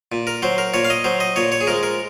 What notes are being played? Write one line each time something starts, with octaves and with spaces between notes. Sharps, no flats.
A#2
A#4
F#3 C5
A#4
A#2 C#5
F5
D#5
F#3 C5
D#5
A#2 C#5
C#5
G#4
F3 G#3 A#4
A#4